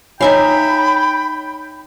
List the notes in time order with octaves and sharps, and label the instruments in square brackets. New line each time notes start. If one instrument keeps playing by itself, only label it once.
[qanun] D#4 E5 F5 [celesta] C#5 G#5 [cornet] G5 [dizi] B5